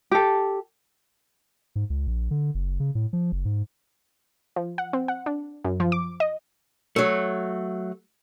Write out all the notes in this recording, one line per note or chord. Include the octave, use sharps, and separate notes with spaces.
G4 A4
G#2
C#2
A#1
D3
F#1
C#3
A2
F3
F#1
G#2
F3
F#5
C4
F#5
D4
F#2
F3
D6
D#5
F#3 A3